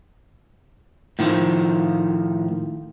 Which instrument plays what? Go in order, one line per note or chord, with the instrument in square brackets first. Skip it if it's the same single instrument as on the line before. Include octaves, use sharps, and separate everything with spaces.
[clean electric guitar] A2 D#3 F3